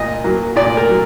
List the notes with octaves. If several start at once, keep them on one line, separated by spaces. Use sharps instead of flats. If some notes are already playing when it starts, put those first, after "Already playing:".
Already playing: A#2 D#5
F#3 A#3
A#2 D5
A#4
F#3